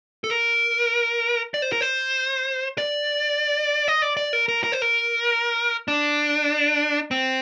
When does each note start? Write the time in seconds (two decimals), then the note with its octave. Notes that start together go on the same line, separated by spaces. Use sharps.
0.24 A4
0.30 A#4
1.54 D5
1.62 C5
1.72 A#4
1.81 C5
2.78 D5
3.88 D#5
4.02 D5
4.17 D5
4.33 A#4
4.49 A#4
4.64 A#4
4.72 C5
4.82 A#4
5.88 D4
7.11 C4